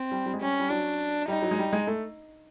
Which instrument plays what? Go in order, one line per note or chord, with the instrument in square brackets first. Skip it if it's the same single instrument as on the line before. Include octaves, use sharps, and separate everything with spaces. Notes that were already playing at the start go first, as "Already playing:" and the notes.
Already playing: [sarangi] C4
[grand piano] G3
G3
G#3
[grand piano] G3 [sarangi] C#4
[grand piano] G3
[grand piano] F#3 [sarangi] D4
[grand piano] G3 [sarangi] D#4
[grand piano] F#3
G#3
G3
G#3
A3